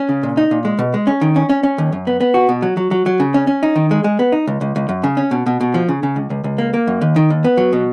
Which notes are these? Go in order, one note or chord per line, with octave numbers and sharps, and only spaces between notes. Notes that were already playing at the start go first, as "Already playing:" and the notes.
Already playing: C#4
C#3
A#2
D#4
A#2
G#3
B2
G#3
C#4
D#3
C#4
C#4
C#4
D#2
F#2
B3
B3
F#4
B2
F#3
F#3
F#3
F#3
C#3
C#4
C#4
D#4
D#3
G#3
G#3
B3
D#4
C#2
C#2
C#2
F#2
C#3
C#4
B2
B2
B2
F3
C#3
C#3
C#2
C#2
C#2
A#3
A#3
F#2
D#2
D#3
D#2
B3
F#3
B2